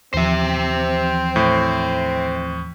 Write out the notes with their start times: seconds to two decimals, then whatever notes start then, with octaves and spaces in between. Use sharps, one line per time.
0.14 D#2 E3 F3 C4 C5 E5
1.36 A2